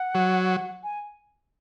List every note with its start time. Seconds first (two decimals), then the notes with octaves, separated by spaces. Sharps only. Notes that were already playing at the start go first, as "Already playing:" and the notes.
Already playing: F#5
0.15 F#3
0.83 G#5